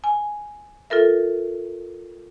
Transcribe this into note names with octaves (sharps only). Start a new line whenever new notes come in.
G#5
F4 A4 A#4 E5